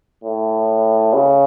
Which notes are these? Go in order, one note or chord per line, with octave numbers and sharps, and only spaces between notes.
A2
C#3